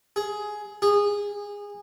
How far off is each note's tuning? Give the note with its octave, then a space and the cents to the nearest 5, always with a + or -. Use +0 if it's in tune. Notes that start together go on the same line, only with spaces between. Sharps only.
G#4 +15
G#4 -20